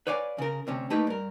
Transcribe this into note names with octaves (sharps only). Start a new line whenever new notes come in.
B4 C#5 D5 F5 G#5
C#3 A#4
D2 C3 C#4
A3 A#3 D#4 G4 B4
G2 A#4